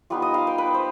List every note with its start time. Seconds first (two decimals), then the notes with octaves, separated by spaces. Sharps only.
0.10 G3 B3 D#4 F4
0.22 D#5
0.34 F5
0.47 G5
0.58 B4
0.74 C5